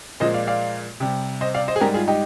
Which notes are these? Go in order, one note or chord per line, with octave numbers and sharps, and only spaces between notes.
A#2 F3 G#3 C5 D#5
D5 F5
D5 F5
C3 G3
C5 D#5
D5 F5
C5 D#5
G#4
G#2 G3 G4 A#4
F4 G#4
D#4 G4